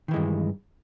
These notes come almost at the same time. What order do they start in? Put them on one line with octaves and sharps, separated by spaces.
D#3 E3 G#3 G2